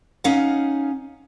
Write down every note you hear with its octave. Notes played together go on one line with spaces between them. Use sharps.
C#4 D#4 F5 F#5